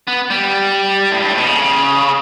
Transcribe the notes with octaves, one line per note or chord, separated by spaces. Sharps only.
B3
G3
A2
G2
A2
B2
C#3